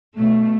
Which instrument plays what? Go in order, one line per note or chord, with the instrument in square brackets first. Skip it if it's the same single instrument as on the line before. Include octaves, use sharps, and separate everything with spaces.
[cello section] B2 A3